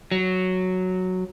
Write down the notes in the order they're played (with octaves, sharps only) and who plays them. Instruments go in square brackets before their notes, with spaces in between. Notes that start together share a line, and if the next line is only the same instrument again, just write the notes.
[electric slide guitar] F#3